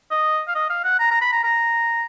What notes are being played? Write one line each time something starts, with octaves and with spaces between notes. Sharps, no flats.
D#5
F5
D#5
F5
F#5
A#5
A#5
B5
A#5
A#5